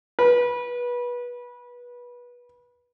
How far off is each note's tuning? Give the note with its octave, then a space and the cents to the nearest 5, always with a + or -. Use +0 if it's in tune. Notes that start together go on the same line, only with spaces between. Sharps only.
B4 -25